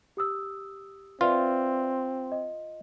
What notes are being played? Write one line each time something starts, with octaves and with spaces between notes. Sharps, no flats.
G4 D#6 E6
C4 F4 B4 D5 E5
D#5